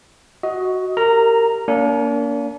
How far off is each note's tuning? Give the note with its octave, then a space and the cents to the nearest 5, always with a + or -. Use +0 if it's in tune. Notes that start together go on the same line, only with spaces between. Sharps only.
F#4 +0 D#5 +20
G4 +0 A#4 -20 A#5 +0
A#3 +0 D4 -45